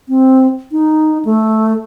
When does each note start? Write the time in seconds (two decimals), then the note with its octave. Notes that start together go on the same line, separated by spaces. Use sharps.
0.09 C4
0.72 D#4
1.25 A3